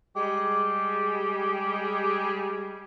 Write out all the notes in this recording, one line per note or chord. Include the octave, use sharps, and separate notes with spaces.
G3 G#3 G4 G#4